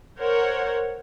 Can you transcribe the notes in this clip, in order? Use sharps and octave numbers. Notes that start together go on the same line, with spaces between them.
A#4 C5 C#5 F#5